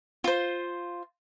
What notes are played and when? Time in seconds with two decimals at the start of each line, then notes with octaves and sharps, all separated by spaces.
0.24 F4 C5